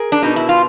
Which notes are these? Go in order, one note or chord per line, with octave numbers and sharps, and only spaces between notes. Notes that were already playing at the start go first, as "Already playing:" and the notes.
Already playing: G#4 A#4
D4
B2 D#4
E4
F4